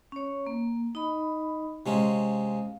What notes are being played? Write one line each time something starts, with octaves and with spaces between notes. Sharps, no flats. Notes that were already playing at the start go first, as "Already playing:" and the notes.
C#4 C#5
A#3
D#4 D#5 B5
C3 G#3 C#4 F5